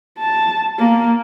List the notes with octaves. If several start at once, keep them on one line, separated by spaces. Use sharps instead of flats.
A5
A#3